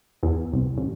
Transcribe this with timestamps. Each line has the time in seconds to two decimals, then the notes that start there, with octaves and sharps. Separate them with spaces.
0.23 E2
0.53 C2
0.78 A1